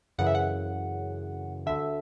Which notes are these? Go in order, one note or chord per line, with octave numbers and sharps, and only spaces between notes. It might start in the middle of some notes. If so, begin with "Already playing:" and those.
F#2 C#3 E3 F#5
E5
F#5
D2 D3 E5